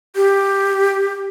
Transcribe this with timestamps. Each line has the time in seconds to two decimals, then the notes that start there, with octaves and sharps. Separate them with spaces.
0.16 G4